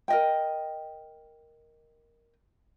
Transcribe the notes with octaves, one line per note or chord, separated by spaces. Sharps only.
A#4 D#5 G5